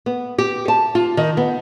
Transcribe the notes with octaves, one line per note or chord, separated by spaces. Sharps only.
B3
G4
A5
F4
D#3
B3